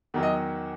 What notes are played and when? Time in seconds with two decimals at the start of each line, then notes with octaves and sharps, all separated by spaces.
0.14 E2 D#3 F#3
0.23 D#5